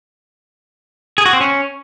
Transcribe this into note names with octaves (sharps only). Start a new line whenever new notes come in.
G#4
F#4
C4
C#4